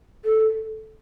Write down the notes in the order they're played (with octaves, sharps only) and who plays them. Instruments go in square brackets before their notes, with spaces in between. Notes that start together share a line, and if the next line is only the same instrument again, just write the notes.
[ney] A4